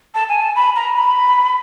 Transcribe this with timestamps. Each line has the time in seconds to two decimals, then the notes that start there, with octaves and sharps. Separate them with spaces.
0.14 A5
0.29 G#5
0.42 A5
0.56 B5
0.76 A#5
0.96 B5